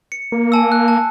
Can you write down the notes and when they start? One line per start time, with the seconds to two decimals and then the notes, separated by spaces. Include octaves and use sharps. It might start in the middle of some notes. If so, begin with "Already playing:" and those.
0.12 C#7
0.32 A#3
0.52 G#5 A5 E6
0.72 F#6
0.88 A5